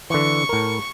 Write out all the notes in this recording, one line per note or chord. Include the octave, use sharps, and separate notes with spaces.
D3 E3 C#6
A2 A#4